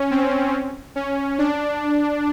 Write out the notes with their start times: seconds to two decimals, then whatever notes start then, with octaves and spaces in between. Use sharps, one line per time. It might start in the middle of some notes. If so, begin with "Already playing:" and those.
Already playing: C#4
0.11 C4
0.96 C#4
1.39 D4